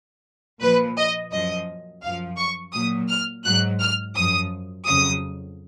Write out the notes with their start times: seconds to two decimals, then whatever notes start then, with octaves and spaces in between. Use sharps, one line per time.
0.62 A#2 F3 B4
0.97 D#5
1.32 F#2 F3 D#5
2.03 F#2 F3 F5
2.38 C#6
2.73 A#2 F#3 D#6
3.09 F6
3.44 G#2 F#3 F#6
3.80 F6
4.15 F#2 F3 D#6
4.86 F2 C#3 F#3 D#6